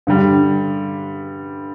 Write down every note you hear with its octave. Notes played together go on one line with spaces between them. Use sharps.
G2 D3 G3